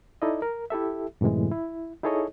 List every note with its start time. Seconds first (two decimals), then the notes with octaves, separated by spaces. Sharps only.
0.22 D#4 E4 A4 D5 D#5
0.42 A#4
0.70 E4 G4 A4 E5
1.21 F#2 A2 C3 E3 G#3
1.51 E4
2.03 D#4 E4 G#4 A4 C#5 D#5